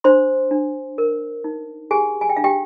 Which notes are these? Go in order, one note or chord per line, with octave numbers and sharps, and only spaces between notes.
D4 C5 C6
D4
A#4
D#4
G4 G#4 G#5
G#5
G5
D4 F5
G4 G5